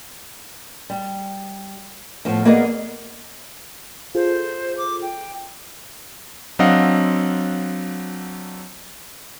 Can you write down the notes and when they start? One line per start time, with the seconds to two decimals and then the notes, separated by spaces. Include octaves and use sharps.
0.90 G3
2.25 A2 F3 B3
2.45 A#3 B3 G#4 A#4 D5 D#5
4.15 F4 G#4 A4 C5
4.78 D6
5.02 G5
6.59 F#3 C4 D4 D#5 F5 F#5